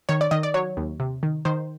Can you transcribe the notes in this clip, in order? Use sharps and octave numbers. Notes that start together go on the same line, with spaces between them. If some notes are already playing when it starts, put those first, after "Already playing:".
D#3 C#5
D5
D#3 D#5
D5
F#3 C#5
D#2
C3
D#3
D#3 C5